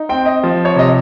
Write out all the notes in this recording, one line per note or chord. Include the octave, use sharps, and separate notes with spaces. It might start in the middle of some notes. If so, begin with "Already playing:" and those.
Already playing: D#4
C4 G5
D#5
F3
C#5
C3 D#5